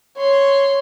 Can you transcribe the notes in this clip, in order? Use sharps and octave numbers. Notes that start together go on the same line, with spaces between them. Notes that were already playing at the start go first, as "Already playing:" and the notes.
C#5 C6